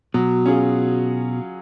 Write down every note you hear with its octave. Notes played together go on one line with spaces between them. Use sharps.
B2 F#3
C#4 F4 G#4